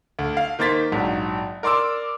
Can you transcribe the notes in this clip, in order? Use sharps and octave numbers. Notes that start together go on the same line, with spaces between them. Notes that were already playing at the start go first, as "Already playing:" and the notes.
D2
F5
D#3 A#3 C5 A6 B6
A#1 G#2 F#3
A#4 D5 C6 D6 E6